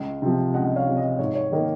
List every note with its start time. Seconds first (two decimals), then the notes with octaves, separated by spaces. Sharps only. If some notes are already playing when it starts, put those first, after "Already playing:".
Already playing: C#2
0.22 C3 F3
0.54 C#2 D#5 F#5
0.76 C#5 F5
0.86 C3 F3
0.97 D#5
1.19 G#2 C#5
1.35 C#5
1.52 D#3 A#3 D#5